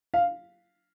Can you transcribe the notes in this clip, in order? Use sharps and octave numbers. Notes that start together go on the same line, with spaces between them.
F5